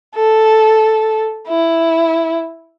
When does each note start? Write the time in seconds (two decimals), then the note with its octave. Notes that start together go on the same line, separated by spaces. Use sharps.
0.16 A4
1.48 E4